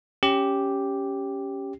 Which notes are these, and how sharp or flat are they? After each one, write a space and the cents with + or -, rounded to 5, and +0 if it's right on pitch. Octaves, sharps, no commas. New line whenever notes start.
C#4 +0 G4 +0